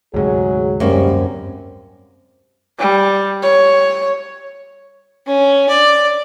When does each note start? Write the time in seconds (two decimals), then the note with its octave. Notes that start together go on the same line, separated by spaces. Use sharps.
0.14 D2 G#2 C3 F#3 G#4
0.80 F#2 G3 A#3 C4 C#4
2.79 G3
3.43 C#5
5.26 C#4
5.69 D5